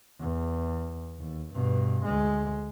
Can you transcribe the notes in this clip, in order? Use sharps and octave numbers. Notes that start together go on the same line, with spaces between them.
E2
D#2
G2 B2
D2 G#3